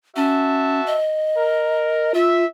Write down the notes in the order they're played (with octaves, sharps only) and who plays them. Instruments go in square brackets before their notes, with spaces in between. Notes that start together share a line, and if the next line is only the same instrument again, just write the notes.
[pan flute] C#4 [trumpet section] F#4 E5 A5
[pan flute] D#5
[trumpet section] A#4
[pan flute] F4 [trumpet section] E5